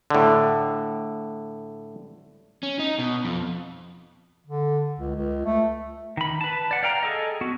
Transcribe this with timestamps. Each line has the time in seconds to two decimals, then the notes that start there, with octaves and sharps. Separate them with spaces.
0.10 A2 D3
2.63 C#4
2.79 D#4
2.99 B2
3.25 F2
4.47 D3
4.99 C#2
5.15 C#2
5.45 A3
6.17 D#3 B5
6.41 B4 A5
6.71 D5 F#5
6.83 D5 F5 G5 A#5
7.03 G#4 A4 D#5
7.41 B3 F#4